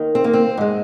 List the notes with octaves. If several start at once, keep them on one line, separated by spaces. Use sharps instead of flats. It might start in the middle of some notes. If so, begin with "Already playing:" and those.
Already playing: D#2 D#3
C4
A#3
C4
G#2 G#3